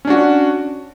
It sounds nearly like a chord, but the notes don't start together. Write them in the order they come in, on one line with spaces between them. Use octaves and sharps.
C#4 D4 F#4